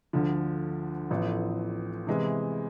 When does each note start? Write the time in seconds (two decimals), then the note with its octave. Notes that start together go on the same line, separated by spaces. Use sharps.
0.13 D2 D3 F3
1.10 A1 A2 F3 B3
2.07 C3 E3 G#3 B3 E4